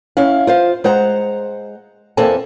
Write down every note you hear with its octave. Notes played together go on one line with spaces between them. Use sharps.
C#4 E4 F5
F4 C5 F5
G#3 C5 F#5 A#5
E2 A#3 C4 A4 G#5 A5